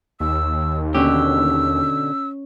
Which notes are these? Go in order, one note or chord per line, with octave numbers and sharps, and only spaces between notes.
D#2 E6
B2 D3 C#4 G4 E6